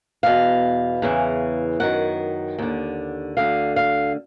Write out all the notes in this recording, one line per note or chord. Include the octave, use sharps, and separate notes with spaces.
E2 B2 F5
E2 C#3 E3
F#2 D#3 F#5
D#2 D3
D2 D3 F5
F5